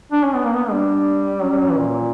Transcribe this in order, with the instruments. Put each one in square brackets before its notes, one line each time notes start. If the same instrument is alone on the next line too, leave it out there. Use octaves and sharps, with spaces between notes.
[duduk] D4
C#4
B3
A#3
B3
[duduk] G3 [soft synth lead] D4
[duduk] F#3 [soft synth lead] C#4
[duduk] G3
F#3
E3
A#2